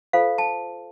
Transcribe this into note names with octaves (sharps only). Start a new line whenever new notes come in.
F4 A4 C5 F5
A5